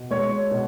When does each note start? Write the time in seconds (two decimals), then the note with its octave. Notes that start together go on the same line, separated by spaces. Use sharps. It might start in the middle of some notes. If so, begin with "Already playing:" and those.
Already playing: B2
0.11 G#3 C#5
0.51 B2